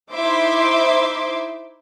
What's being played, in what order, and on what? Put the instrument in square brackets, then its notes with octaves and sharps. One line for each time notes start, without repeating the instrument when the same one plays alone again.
[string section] D#4 E4 C5 E5 C6 D6